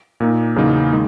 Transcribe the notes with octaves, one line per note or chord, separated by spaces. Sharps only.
A#2 A#3 D#4
E2 C#3 F#3 A#3 D#4
D#3 G#3